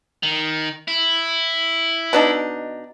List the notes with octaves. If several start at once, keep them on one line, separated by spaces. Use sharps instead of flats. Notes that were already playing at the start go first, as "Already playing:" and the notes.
D#3
E4
B2 D4 D#4